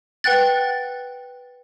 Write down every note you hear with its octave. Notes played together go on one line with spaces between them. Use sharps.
B4 F#5 G5 F#6 A6